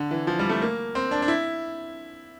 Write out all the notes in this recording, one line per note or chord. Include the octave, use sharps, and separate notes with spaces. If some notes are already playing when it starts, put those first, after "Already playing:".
Already playing: D3
E3
F3
G3
A3
A#3
C4
D4
D4
E4